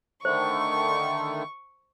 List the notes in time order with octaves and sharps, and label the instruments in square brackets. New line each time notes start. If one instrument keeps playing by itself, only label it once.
[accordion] D3 D#3 A3 [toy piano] C5 [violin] C#6